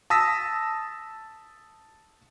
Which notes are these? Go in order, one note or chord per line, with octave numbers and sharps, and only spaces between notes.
A5 D#6 E6 A#6 B6